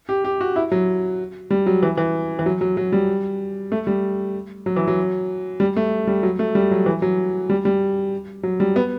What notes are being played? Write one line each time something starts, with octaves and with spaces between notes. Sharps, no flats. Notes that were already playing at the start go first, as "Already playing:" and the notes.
G4
G4
F#4
E4
F#3
G3
F#3
E3
E3
E3
F#3
F#3
F#3
G3
A3
G3
F#3
E3
F#3
G3
A3
G3
F#3
A3
G3
F#3
E3
F#3
G3
G3
F#3
G3
B3